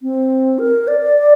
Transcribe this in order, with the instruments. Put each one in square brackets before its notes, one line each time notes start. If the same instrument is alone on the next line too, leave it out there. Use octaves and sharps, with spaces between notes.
[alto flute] C4
A#4
D5